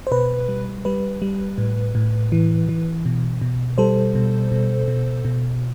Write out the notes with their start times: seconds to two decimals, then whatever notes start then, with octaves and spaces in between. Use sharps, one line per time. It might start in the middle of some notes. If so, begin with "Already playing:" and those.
0.07 C5
0.11 B2 B4
0.49 G3
0.85 G3 B4
1.22 G3
1.58 A2
1.95 A2
2.32 E3
2.69 E3
3.06 B2
3.42 B2
3.78 G3 A4 C5
4.15 B2
4.52 B2
4.88 B2
5.25 B2